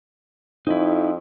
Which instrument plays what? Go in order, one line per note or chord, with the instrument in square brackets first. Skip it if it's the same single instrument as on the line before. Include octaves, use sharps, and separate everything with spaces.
[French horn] F2 [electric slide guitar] D#4 E4